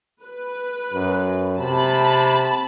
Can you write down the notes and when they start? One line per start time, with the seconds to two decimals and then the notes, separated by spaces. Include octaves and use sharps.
0.22 B4
0.93 F#2
1.59 C3 A5 B5